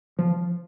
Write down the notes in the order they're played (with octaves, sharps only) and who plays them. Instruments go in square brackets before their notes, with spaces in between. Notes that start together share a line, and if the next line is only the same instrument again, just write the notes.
[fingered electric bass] F3